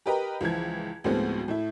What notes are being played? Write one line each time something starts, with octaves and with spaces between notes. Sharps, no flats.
G4 A#4 B4 D#5 G5 A#5
C#2 E3 F3 G#6
D2 A2 F3 G#3 B3 C4
A2 E4